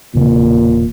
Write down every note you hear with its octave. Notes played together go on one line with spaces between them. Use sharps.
E1 A#2 C#3 C4